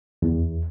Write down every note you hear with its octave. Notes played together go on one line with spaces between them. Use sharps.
E2